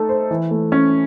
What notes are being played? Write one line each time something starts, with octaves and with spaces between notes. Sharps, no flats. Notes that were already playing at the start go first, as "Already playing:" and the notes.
Already playing: A3 D#4 A4
C5
E3
A3
C#4